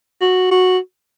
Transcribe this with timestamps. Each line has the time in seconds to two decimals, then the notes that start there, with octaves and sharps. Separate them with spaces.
0.21 F#4
0.51 F#4